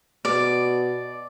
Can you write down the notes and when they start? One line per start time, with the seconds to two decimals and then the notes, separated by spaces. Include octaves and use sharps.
0.25 B2 D5